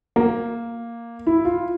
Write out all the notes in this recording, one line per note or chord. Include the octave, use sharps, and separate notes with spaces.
A#3
E4
F4